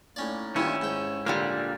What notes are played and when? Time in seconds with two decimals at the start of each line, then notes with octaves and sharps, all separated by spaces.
0.16 A2 A#3 C#4 D#4 D5
0.56 G2 A#2 D#3 C#4 E4 C#5 E6
0.82 G#2 G5
1.26 A#2 D3 G3 A#3